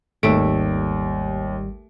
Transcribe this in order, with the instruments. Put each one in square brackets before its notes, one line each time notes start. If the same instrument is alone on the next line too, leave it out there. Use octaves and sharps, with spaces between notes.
[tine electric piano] G#1 G3 [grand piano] D#2 D7 [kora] A3